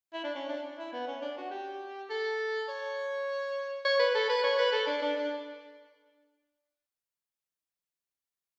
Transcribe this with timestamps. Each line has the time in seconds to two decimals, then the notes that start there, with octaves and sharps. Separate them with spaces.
0.13 E4
0.24 D4
0.35 C#4
0.49 D4
0.79 E4
0.93 B3
1.08 C#4
1.22 D4
1.37 F#4
1.51 G4
2.10 A4
2.69 C#5
3.85 C#5
3.99 B4
4.14 A4
4.30 B4
4.44 C#5
4.59 B4
4.72 A4
4.87 D4
5.02 D4
5.16 D4